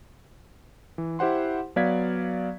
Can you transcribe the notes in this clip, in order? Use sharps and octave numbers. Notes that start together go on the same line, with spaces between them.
E3
E4 G4 C5 F#5 C6
F#3 B3 D5 F5 G#6 B6